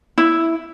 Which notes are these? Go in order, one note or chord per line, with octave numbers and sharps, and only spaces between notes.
E4